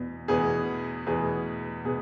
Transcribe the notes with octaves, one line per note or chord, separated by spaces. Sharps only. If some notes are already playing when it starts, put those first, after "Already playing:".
Already playing: E2 B2 B3
E2 B2 B3 G#4
E2 B2 B3 G#4
B2 B3 G#4